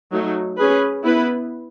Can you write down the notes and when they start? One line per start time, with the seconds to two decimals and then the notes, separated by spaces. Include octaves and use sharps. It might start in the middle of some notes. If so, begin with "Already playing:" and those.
0.12 F#3 A3 D#4
0.57 C#4 G#4 B4
1.03 B3 E4 B4